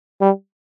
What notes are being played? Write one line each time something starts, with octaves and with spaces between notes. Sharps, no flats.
G3